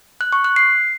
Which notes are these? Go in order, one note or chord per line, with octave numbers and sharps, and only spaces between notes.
F#6
C#6
F#6
C7